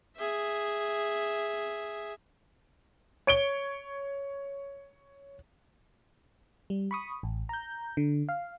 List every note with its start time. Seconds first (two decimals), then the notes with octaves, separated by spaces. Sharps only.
0.17 G#4 E5
3.27 C#5 D7 G7
6.70 G3
6.91 B5 C#6 D#6
7.23 A1
7.49 A#5 G6
7.97 D3
8.29 F5